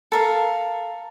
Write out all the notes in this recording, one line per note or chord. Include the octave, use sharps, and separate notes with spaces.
A4 A#4 F5